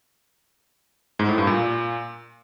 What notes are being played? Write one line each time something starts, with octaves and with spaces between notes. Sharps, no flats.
G#2
A2
G2
A#2